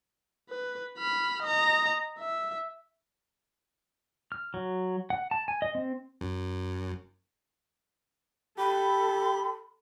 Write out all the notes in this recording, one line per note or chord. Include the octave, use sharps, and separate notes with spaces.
B4
B5 F6
D#5 A#5
E5
F6
F#3
F#5
A5
G#5
D#5
C4
F#2
G4 A4 B5